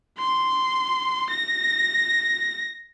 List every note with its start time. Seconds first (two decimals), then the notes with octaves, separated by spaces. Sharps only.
0.18 C6
1.30 A#6